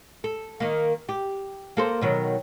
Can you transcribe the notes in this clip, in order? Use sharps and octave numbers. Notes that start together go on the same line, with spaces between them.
A4
D#3 A#3
G4
A#3 A4 C5
B2 D#3 F#3